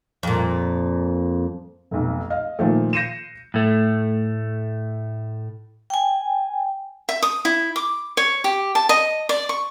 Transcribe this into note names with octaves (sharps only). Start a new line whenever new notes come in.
F2 A#2
F1 B1
D#5 F5
A#2 D#3 F3 A3
G6 A#6 C7 C#7 D#7 E7
A2 A3
G5 G#5
E5
D#6
E4
D6
C#5
G4
A5
D#5
D5
C#6